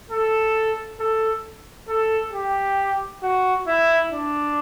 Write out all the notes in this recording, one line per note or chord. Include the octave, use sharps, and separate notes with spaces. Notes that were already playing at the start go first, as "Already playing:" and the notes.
A4
A4
A4
G4
F#4
E4
D4